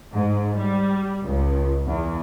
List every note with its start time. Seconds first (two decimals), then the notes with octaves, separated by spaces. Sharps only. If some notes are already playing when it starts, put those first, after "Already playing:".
0.12 G#2
0.54 G3
1.26 C#2
1.86 E2